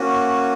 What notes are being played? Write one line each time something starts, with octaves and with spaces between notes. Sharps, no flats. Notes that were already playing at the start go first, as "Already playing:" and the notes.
Already playing: A#3 C#4 F#4